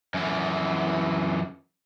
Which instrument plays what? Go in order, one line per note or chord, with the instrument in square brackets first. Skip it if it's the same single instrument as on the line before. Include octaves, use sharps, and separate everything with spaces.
[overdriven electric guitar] F#2 E3